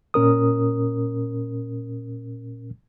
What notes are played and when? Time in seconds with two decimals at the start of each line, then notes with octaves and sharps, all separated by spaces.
0.14 A#2 C#4 A#4 D#6